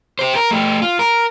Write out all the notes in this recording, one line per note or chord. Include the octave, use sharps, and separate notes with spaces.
G4 C5
A#4
A3 G4
F4
A#4